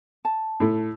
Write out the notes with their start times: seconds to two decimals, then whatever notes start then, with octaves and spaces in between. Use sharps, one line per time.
0.25 A5
0.60 A2 A3